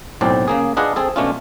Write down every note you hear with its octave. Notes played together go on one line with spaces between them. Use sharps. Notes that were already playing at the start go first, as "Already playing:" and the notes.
B1 A2 C4 D5 A5
C#3 A#3 G#4
D4 F4 G#4 B4 D#5 F#5
C4 G#4 A4
B2 A3 C#4 D4 F4